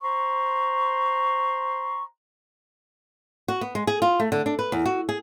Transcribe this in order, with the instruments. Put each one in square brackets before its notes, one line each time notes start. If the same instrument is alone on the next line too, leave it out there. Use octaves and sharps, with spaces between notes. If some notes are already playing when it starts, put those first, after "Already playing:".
[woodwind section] C5 A#5 C6 C#6
[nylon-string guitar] F#4
B3
G#3
G#4
F4
A3
D3
D4
B4
E2
F#4
G#4